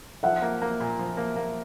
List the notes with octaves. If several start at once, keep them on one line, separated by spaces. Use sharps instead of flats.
F3 E5 F#5
A#3
A#3
A#2
F3
A#3
A#3